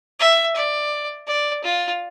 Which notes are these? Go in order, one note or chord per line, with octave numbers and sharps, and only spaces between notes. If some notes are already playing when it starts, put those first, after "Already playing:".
E5
D5
D5
F4